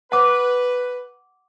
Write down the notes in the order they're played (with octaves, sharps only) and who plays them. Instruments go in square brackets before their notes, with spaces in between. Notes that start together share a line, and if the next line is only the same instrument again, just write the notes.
[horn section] B4 [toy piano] F#5 D6